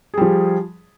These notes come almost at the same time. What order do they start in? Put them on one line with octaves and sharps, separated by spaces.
G#4 G3 F3